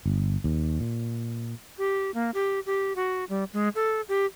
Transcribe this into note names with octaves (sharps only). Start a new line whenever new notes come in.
G1
D#2
A#2
G4
A#3
G4
G4
F#4
G3
G#3
A4
G4